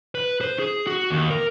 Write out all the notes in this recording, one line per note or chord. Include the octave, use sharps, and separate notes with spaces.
B4
C5
G#4
F#4
D#2
A#4